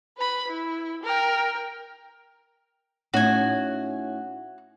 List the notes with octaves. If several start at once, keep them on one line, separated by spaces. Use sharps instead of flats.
B4 B5
E4
A#4 G5
A2 C#4 D#4 F#4 G#5